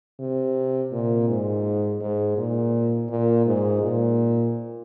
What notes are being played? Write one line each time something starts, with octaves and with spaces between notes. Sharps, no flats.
C3
A#2
G#2
G#2
A#2
A#2
G#2
A#2